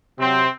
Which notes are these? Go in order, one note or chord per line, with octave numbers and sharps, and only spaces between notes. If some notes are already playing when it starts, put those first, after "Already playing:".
C3 F#3 C4